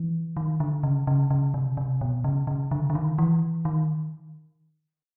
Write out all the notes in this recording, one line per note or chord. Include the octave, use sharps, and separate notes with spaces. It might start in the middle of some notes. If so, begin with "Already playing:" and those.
Already playing: E3
D#3
D3
C#3
C#3
C#3
C3
C3
B2
C#3
C#3
D3
D3
D#3
E3
D#3